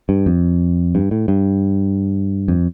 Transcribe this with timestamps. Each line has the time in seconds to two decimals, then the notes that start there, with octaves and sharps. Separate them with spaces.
0.09 G2
0.26 F2
0.95 G2
1.11 A2
1.28 G2
2.48 F2